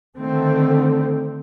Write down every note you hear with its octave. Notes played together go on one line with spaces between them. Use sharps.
D3 D#3 A3 C4